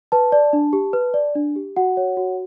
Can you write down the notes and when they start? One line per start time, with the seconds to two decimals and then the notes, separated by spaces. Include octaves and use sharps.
0.12 B4 A5
0.32 D5
0.53 D4
0.73 G4
0.93 B4
1.14 D5
1.35 D4
1.56 G4
1.76 F#4 F#5
1.97 C#5
2.17 F#4